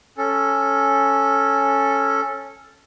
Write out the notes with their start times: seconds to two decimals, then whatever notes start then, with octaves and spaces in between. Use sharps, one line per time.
0.18 C#4 A4